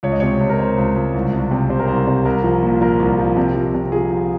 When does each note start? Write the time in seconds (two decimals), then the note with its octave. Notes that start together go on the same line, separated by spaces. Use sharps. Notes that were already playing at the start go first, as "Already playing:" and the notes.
0.03 C#2 C#5
0.12 D#5
0.20 C3 C#5
0.41 C#2
0.50 A#4
0.59 C3 C5
0.78 C#2
0.96 C#2
1.14 C2
1.32 C2
1.51 C3
1.70 C3 C5
1.80 A#4
1.87 C2 C5
2.07 C3
2.25 C2 A#4
2.44 F3
2.63 A#2
2.81 F3 A#4
2.99 C2
3.19 F3
3.37 C3
3.55 F3
3.74 C3
3.92 F3 G#4
4.10 F3